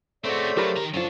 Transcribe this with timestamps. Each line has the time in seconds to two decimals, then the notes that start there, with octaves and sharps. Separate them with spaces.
0.25 C#3 A3 C4 F#4 C5 D5
0.57 F#3 G4 A#4 B5
0.77 D#3 A#5
0.94 F#2 F3 D4 F4 A4 C#5